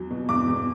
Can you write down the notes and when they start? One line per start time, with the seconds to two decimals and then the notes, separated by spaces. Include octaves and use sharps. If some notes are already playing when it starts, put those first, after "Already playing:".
Already playing: E2 F#3
0.10 B2
0.29 E2 D6
0.47 E2